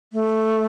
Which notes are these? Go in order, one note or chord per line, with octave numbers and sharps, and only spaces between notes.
A3